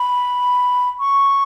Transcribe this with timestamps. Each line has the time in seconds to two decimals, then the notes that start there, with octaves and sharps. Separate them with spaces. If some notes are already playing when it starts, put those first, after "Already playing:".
Already playing: B5
1.00 C#6